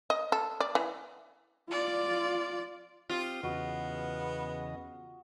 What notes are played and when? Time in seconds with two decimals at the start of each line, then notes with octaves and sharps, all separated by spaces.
0.10 D#5
0.32 A4
0.60 D5
0.75 E3
1.71 F4 D5
3.10 C4 F4 G4 D#6
3.43 E2 C#3 B3 F#4 D#5